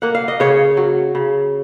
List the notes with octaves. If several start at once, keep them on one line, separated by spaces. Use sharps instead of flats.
A#3 F#5
F5
D#5
C#3 C#5 F5
F#3
C#3